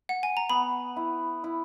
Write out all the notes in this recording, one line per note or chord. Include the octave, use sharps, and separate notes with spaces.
F#5
G#5
A#5
B3 B5
E4
E4